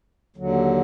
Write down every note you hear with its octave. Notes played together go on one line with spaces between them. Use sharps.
D#2 D3 F#3